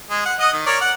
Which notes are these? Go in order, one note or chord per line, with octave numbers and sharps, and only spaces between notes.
G#3
F#5
D#5 F#5 D#6
D#3
A#4 C#5 D5
F#5